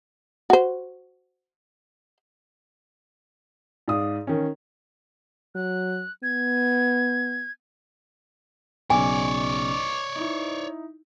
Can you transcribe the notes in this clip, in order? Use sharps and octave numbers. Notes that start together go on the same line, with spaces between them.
F#4 C5
G#2 D5 F5 D#6
D#3 C#4
F#3 F#6
B3 G#6
B1 C#3 C#5 D5 G#5
D#4 E4